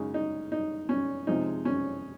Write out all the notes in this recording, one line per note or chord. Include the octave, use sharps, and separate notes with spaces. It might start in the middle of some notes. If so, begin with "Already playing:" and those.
Already playing: F#2 C#3 G#3 C#4 D#4
D#4
D#4
C#4
C3 F3 G#3 D#4
C#4